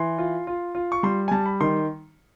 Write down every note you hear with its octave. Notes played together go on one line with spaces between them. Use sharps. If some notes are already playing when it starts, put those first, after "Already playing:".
Already playing: E3 C6
F4
F4
F4
C#6
G3 C6
G#5
G3 A5
B5
D#3 C6